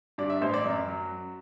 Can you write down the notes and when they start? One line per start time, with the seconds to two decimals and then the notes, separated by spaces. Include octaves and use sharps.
0.18 G2 D5
0.30 E5
0.41 A1 C5
0.54 D5
0.64 F#2 E5
0.88 F#3